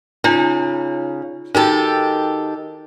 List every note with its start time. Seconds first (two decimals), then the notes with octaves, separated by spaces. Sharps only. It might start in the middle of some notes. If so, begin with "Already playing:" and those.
0.24 C#3 D#4 F4
1.55 D#3 D#4 F#4 G4 A4